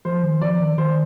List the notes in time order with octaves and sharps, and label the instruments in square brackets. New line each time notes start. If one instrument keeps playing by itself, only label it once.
[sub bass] F3 [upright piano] C5
[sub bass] D#3
[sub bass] F3 [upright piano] D5
[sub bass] D#3
[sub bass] D#3 [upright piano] C5